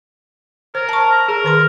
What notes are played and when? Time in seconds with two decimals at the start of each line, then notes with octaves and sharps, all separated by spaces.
0.75 A#4 C5
0.89 A5 C#6
1.12 A#5
1.28 G#4 A#4
1.44 D#3 B4 C6